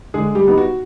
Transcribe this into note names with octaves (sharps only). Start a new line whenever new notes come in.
D3 G#3 G#4
G3 G4
G3 B3 D#4
F#4